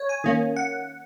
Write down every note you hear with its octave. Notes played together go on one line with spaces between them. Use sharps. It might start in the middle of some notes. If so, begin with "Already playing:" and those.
Already playing: C#5
G#5
D#3 A#3 C#4
F#5